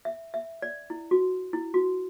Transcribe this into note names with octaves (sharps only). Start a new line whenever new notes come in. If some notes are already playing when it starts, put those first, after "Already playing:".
E5
E5
D5
E4
F#4
E4
F#4